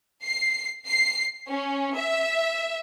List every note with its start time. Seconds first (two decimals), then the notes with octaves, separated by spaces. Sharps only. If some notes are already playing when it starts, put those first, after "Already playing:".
0.23 C7
0.87 C7
1.48 C#4
1.95 E5